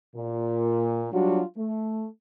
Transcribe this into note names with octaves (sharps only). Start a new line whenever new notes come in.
A#2
F#3 G3 D4 F4 F#4
A3